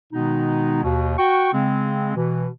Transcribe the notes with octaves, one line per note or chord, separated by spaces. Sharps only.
B2 D#3 G#3 B3 D#4
D#2 B2
F#4 G5 C#6
C#3 G#3 C4
B2 E3